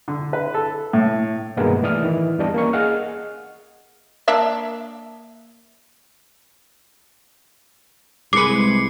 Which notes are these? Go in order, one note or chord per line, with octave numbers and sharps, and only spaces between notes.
D3
B4
A4
A2
G2 B2 D#3 G#3 A#3 B3
A2 E3 D5 D#6 F6
D#3 E3
E2 G3 D4 D#5
A#3 C#4 C#6
G#4 D#5 F5 F#5 F6
A#3 D4 E5
C2 G#3 B4 D6 C7 C#7